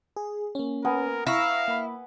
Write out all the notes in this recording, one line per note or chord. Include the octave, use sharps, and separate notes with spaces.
G#4
A#3 C#4
B3 A#4 G#5
E4 F5 A#5 C#6 A#6
A#3 B5